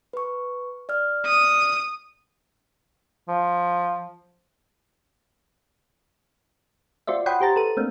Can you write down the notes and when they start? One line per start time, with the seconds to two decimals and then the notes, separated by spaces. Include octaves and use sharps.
0.13 B4 C#6
0.89 D5 F6
1.26 D#6
3.28 F3
7.07 F4 F#4 C5 D5 E5
7.26 C#5 F#5 G5 B5 C6 D#6
7.41 G4 C5 A#5 A6
7.56 A4 B4 D#7
7.77 A3 A#3 C4 D4